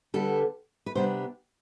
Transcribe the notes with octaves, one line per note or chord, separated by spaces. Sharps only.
D3 G3 B3 A4
B4
C3 G3 B3 D4 C5